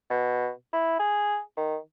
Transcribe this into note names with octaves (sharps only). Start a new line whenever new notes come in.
B2
E4
G#4
D#3